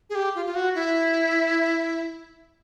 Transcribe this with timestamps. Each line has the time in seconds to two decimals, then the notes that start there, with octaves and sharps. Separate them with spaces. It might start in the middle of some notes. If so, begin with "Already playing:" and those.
0.10 G#4
0.15 G4
0.35 F4
0.46 F4
0.55 F#4
0.75 E4